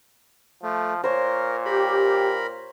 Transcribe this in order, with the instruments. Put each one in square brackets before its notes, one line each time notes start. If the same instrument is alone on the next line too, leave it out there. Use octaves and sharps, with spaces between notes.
[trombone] F3 [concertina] A3
[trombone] A#2 [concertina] A#4 [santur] C5 C#5
[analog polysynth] G4 [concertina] A#4 B5